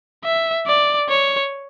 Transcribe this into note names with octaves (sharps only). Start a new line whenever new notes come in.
E5
D5
C#5